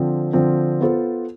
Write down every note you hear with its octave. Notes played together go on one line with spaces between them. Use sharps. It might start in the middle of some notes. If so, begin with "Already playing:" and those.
Already playing: D3 F3 C4
D3 F3 C4
B3 F4 A4 C5